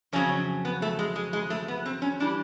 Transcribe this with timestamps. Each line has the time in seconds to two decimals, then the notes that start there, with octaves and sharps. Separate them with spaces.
0.13 F2 C#3 F#3 C#4
0.65 B3
0.82 A3
0.99 G#3
1.16 G#3
1.33 G#3
1.50 A3
1.68 B3
1.86 C4
2.02 C#4
2.20 E3 G3 D4